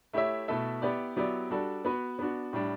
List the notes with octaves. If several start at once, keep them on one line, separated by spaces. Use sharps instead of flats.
A3 E4 G4 C#5 E5
B2 A3 E4 A4 E5
B3 E4 G4 D5
F#3 B3 E4 G4 D5
G3 D4 F#4 A4 D5
B3 F#4 B4
B3 D4 F#4
A2 G3 D4